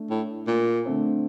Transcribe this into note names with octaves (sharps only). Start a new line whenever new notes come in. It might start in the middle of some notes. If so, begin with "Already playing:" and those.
Already playing: A3 D4
A2
A#2
D3 A3 C4